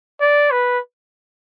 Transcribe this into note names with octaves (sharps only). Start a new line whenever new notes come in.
D5
B4